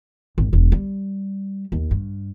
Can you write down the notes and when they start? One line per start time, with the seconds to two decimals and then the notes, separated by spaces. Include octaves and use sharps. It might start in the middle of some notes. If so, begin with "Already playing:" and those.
0.38 G#1
0.53 E1
0.72 G3
1.72 D#2
1.91 G2